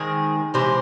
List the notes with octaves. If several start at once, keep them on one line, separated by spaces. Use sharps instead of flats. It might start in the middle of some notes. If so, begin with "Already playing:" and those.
Already playing: D#3 G#3 C4 G#4
C3 E3 G#3 C5